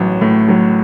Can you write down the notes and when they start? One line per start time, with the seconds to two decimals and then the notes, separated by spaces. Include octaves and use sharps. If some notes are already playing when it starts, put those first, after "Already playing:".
Already playing: A1 F#3
0.21 A2
0.49 F#3